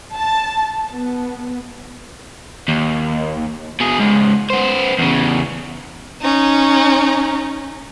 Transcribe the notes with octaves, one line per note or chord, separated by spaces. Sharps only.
A5
B3
D#2
B2 G#4
C#2 G#2
B3 C5
E2 C#3
C#4 D#4